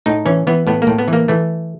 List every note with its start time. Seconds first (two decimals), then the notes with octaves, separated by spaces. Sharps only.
0.06 A2 D#4
0.26 E3 C#4
0.47 E3 B3
0.67 A2 B3
0.82 A#3
0.87 A2
0.99 B3
1.08 E3 A#3
1.28 E3 A3